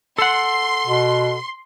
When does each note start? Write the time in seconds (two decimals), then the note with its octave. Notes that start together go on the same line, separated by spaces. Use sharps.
0.18 A4 F#5 C6
0.87 B2